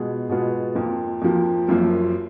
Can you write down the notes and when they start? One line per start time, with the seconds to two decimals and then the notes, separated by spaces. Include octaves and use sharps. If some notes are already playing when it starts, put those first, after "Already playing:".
Already playing: B2 G#3 B3 F4 G#4
0.29 B2 G#3 B3 F4 G#4
0.75 F2 F3 A#3
1.22 F2 F3 A#3
1.68 F#1 F#2 F3 A#3